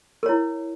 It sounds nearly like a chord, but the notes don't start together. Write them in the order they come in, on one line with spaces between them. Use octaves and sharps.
A#4 C#5 E4